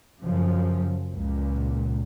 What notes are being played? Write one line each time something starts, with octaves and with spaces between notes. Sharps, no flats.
F#2 C#3 F3
C#2 A#2